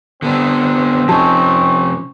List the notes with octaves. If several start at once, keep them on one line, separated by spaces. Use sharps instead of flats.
D3 B3 C4 D4
C3 F3 C#4 D#4 G#4 A5